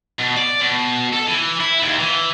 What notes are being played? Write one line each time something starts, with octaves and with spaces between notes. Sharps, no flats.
B2
D5
B2
A4
E3
E4
D#2
E3